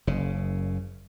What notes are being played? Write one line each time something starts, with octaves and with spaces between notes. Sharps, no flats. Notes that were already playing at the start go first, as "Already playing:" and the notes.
F#1 C#3